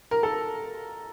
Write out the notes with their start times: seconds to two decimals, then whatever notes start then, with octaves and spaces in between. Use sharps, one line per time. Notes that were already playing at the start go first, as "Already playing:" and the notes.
0.11 A#4
0.23 A4